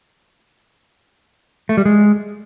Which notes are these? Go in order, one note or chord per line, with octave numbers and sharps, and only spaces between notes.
A3
G3
G#3